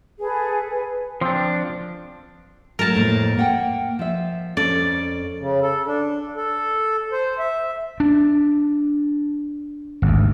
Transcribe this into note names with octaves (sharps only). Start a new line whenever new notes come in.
G#4 A4 B4
B4 G#5
F3 C4 D4
F#3 G3 A3 A#4 A5
F2 A2 A#3
A#3 F#5 G5
F3 E5
F2 C#4 A4 D5
C#3
A4
D4
A4
C5
E5
D4
G#1 D2